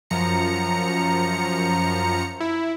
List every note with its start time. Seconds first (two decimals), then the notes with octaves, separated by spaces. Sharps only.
0.10 F#2 F3 A#5 C#7
2.40 E4